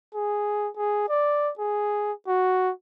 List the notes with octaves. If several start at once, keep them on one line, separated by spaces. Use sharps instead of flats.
G#4
G#4
D5
G#4
F#4